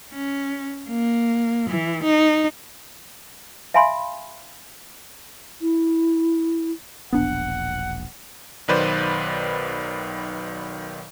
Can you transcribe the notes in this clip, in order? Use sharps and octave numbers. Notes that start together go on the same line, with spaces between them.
C#4
A#3
E3
D#4
E5 F5 G#5 B5 C6
E4
E1 A#1 B3 D4 F#5
B1 D#3 F#3 B4 C5 D5